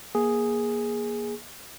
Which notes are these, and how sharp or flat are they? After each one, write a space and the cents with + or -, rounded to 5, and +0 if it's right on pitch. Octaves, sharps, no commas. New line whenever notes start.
A#3 +20 G#4 +0